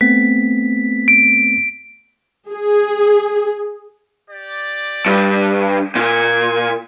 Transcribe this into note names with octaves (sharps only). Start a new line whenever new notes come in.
A3 B3 C4 B6
D7
G#4
G4 D5
G2
A#2 G#5